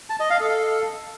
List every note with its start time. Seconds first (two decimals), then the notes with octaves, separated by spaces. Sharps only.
0.10 A5
0.20 D#5
0.30 F5
0.40 A4